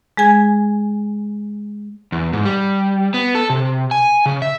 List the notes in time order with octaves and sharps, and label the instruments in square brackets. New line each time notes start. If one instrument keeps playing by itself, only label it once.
[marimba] G#3 G#4 G#5 G#6
[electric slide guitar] E2
G#2
G3
B3
A4
C3
G#5
C#3
E5